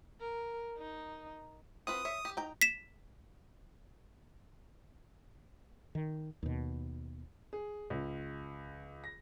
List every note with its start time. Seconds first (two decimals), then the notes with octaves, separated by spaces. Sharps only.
0.21 A#4
0.78 D#4
1.87 C4 F4 B4 D#6
2.05 C#5 E5
2.25 G4
2.37 D#4 G5 A#5
2.62 B6 E7
5.95 D#3
6.43 D#2 B2
7.53 G#4
7.90 C#2
9.04 A#6